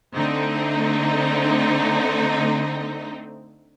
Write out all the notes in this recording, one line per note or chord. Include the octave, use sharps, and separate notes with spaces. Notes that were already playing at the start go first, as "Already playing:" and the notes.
D3 A3 C4 D#4